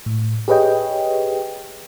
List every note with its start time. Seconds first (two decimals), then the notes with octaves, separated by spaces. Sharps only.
0.06 A2
0.48 G4 G#4 B4 C#5 D#5 G5